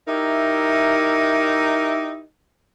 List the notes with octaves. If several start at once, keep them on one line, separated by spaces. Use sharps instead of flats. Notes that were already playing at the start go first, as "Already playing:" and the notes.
D#4 E4 G4 A#4 E5